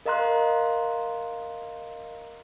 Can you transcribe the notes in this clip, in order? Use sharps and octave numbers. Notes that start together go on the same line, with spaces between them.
A#4 D#5 F5 A#5 C6 F#6